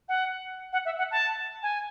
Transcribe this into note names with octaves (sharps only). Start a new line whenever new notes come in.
F#5
F#5
E5
F#5
A5
G#5